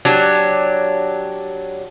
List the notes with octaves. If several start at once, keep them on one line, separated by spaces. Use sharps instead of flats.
F#3 D4 G4